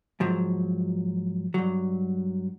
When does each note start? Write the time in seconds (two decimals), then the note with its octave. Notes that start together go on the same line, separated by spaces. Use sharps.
0.20 G#2 F3 F#3
1.54 G2 F#3